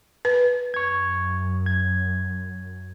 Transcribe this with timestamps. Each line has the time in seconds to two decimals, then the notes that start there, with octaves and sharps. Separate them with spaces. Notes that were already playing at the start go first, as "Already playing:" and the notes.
0.25 B4
0.74 F#2 C#6 G#6
1.66 G#6